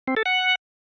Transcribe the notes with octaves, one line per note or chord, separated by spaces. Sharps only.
C4
A4
F#5